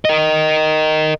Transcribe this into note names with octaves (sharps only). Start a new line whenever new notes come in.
A#4 D#5